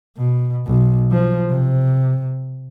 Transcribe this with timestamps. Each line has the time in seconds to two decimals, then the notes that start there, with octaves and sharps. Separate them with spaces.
0.17 B2
0.67 B1
1.12 F3
1.49 C3